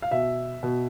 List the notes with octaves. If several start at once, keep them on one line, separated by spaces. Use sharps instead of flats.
F5
B2 E5
B2